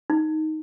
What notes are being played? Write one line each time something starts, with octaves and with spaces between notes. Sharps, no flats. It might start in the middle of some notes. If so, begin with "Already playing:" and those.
D#4